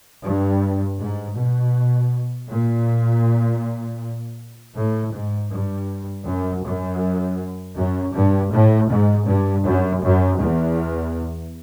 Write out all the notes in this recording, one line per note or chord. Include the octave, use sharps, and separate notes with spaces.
G2
G#2
B2
A#2
A2
G#2
G2
F#2
F#2
F#2
G2
A2
G#2
G2
F#2
F#2
E2